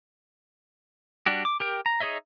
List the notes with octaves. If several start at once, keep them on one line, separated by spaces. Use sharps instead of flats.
G3 D4 F#4 G4
D6
G4 A#4 G5
A#5
D#4 G#4 C#5 D#5 E5